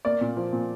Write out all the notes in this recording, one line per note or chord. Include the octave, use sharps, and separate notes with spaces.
A#3 D5
A#2
F3
A#2